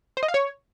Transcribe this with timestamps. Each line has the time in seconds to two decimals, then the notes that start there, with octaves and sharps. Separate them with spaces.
0.17 C5
0.23 D#5
0.28 F5
0.34 C#5